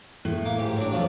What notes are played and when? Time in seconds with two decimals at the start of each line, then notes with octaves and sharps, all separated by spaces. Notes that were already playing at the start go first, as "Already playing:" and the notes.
0.25 A2
0.45 A#3
0.58 G#2 G4
0.77 F#3 D4
0.92 B1 F2 F3